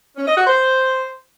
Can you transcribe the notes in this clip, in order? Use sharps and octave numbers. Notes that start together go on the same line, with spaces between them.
C#4
D#5
F#4
C5